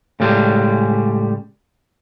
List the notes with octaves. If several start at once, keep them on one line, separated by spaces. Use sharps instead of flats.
A2 C#3 G3 G#3